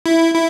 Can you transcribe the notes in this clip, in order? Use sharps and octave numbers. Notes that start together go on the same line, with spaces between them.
E4
E4